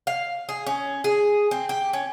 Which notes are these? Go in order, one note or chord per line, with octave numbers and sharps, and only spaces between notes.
F5
G#4
C#4
G#4
C4
G4
C#4